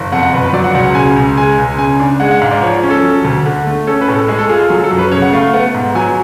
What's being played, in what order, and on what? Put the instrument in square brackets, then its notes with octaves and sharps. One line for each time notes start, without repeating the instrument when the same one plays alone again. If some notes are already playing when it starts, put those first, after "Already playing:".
Already playing: [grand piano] F#1
F2 F#5
F#5
F#1 B4
B4
F#3 D5
F#5
C#2 F#5
F#5
C#3 G#5
C#2
G#3 G#5
C#2
C#3 G#5
D4
G#3 F#5
F#5
G#2 F5
D5
F3 C#5
C#4
A4
F#3
D2
D3
A3
C#4 A4
B4
A2
A4
G#3 G#4
A4
F4 G#4
A4
F#3 G#4
A4
F#2
B4
C#3 C#5
F#5
A3 F5
B3 F#5
G#2
F#3 G#5